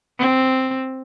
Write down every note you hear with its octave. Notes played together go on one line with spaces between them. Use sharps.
C4